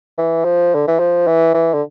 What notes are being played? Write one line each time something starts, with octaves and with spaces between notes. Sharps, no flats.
E3
F3
D3
E3
F3
E3
E3
D3